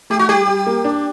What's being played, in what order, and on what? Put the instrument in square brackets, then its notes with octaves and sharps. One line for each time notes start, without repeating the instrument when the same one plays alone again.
[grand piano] A3 [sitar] G4
[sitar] F#4
[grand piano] G3 [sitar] G4
[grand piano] G3
A#3
D4